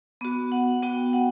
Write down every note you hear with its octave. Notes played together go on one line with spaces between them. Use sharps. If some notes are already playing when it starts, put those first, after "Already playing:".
B3 F#4
F#5
B3 F#4 G5
F#5